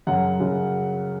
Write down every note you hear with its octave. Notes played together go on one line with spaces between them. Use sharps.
F#2 C#3 F#3 F#5
F#2 C#3 F#3